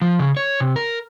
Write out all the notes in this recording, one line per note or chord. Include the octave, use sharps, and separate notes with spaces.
F3
C#3
C#5
C3
A#4